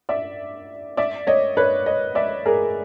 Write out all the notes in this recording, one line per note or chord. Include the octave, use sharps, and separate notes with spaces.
D5 E5
D5 E5
C#5 D#5
B4 C#5
C#5 D#5
D5 E5
G#4 A#4